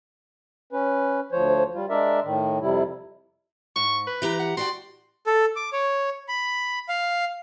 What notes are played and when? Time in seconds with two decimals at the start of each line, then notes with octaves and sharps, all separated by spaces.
0.73 C#4 B4
1.32 D2 F3 C5 C#5
1.74 G3 F4
1.90 G#3 D4 A#4 D5 E5
2.24 A2 D#3
2.61 F2 C3 G3 E4
3.76 G#2 C#6
4.07 B4
4.22 E3 G4 A#5
4.39 F#5
4.57 F#4 D5 G5 C6
5.26 A4
5.56 D6
5.73 C#5
6.28 B5
6.88 F5